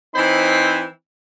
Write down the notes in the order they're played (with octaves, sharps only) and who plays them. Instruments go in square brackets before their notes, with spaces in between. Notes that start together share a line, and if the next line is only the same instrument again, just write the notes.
[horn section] E3 C4 D#4 C5 G#5 B5